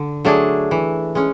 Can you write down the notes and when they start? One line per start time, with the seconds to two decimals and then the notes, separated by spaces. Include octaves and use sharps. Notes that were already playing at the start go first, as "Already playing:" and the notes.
Already playing: D3
0.25 F#3 A3 D4 G#4
0.71 E3
1.15 G#3 C#4